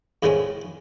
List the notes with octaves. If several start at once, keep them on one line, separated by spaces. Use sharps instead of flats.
D#2 A2 C#3 G#3 C4 C#4